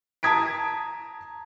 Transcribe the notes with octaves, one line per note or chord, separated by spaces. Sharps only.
A5 A#5 D#6 G#6 B6 D7